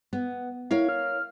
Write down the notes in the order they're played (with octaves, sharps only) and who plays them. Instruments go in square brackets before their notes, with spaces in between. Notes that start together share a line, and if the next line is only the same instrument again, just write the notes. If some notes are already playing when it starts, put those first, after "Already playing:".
[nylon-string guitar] B3
[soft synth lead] E4 [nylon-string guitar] A#4 C#5 F5
[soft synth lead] F6